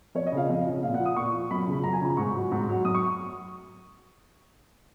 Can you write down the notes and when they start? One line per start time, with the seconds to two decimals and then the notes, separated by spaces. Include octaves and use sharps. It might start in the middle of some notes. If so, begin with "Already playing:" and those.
0.15 F2 C#5
0.27 D#5
0.32 C#3
0.37 F3 F5
0.49 F2
0.66 C#3 F3
0.83 A#2 F5
0.94 F#5
1.00 F3
1.06 D#6
1.16 A#2 C#6
1.33 F3
1.51 F#2 B5
1.67 C#3 F3
1.84 F#2 A#5
1.93 G#5
2.01 C#3 F3 A#5
2.17 G#2 C#6
2.35 F#3
2.52 G#2
2.69 F#3
2.85 F#2 D#6
2.95 C#6